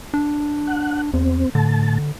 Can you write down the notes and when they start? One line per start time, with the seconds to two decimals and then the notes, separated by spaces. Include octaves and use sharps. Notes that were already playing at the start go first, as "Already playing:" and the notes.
0.14 D4
0.67 F#5
1.14 E2 C4
1.55 A2 D3 A5